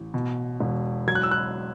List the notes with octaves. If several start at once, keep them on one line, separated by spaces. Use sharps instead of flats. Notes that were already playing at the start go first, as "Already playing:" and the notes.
Already playing: A1
B2
E1
F#3 G#6
F#6
E6
F#6